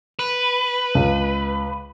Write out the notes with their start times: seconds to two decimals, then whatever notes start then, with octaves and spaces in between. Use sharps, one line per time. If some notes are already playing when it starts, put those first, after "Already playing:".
0.19 B4
0.95 C#2